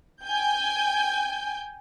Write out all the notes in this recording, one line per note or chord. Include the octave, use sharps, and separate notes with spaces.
G5 G#5 G6